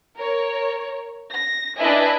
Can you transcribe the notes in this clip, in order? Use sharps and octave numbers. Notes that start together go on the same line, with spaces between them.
A#4 C#5
A#6
D4 E4 B4 D#5 E5 G#5